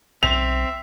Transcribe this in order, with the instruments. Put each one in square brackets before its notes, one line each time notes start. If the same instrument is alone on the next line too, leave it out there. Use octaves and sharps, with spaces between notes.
[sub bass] B1 [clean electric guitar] C4 [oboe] E5 [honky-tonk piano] F7